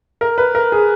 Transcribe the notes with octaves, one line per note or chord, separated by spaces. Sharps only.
A#4
B4
A#4
G#4